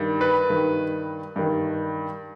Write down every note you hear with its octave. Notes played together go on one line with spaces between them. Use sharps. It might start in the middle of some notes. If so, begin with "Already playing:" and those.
Already playing: G2 D#3
B4
G2 D#3
G2 D#3